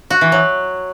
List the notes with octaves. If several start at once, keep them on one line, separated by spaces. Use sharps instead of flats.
F#4
E3
F#3